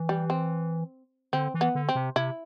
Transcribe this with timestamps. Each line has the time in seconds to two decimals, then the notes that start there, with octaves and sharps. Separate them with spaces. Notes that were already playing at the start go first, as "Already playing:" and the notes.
Already playing: E3
0.09 G3
0.30 C4
1.33 D3 C4
1.54 E3
1.61 B3
1.75 D3
1.89 C4
1.95 C3
2.16 C3 E4